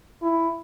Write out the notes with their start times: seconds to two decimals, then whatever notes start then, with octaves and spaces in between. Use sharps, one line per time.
0.22 E4